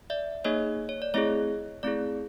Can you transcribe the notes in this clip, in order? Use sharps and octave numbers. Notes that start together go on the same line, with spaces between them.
D5 E5
A#3 D#4 G#4 C#5 D#5
C#5
D5
A3 C4 E4 G#4 C#5 D#5
A3 C4 E4 G#4 D5